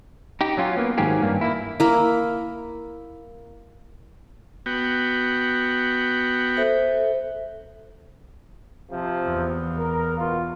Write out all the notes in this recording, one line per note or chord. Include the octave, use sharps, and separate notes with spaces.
D#4 G4
F#3 C#4 F4
A#3 B3
G#2 D#3 F#3 C#4 G4 G#4
G2 A#3
A#3 E4
A#3 E4
B3 F#4 G5
A4 C5 E5
C3 F3
E2
A#4
B2 F4